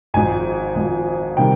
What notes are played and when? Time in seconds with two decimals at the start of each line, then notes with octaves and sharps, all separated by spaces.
0.14 G#1 G#2 F3 G#5
0.75 G#1 G#2 F3
1.37 C3 D#3 G3 G5